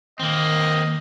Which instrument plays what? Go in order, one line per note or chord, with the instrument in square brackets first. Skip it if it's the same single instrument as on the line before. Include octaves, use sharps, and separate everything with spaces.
[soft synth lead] D#3 [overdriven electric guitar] A#3 C4 [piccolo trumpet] D#5